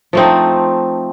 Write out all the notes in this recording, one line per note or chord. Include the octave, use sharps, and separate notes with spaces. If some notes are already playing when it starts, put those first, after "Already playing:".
F3 A3 C4 D#4